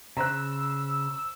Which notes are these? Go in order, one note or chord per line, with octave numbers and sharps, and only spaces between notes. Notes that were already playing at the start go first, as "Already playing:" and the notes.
C#3 C5 A#5 E6 F#6